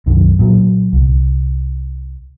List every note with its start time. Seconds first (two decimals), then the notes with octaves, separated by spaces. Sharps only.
0.06 C2 F#2 D#3
0.39 A#2 F#3
0.93 C2